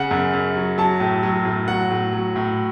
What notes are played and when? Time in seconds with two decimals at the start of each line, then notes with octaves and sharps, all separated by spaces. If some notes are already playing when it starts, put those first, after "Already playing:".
Already playing: C#3 F#5
0.11 F#2
0.34 F#2
0.56 F#3
0.78 F#3 A5
1.00 A2
1.23 F#3
1.45 A2
1.68 F#3 F#5
1.91 A2
2.13 F#3
2.36 A2